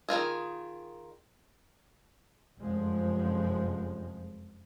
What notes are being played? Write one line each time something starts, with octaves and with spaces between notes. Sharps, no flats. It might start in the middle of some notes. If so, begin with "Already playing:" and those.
D#3 G#3 F4 G#4
F1 F#2 F3 G#3